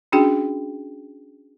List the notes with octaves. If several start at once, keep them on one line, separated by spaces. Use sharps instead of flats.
C#4 D4 F#4 G#4 G5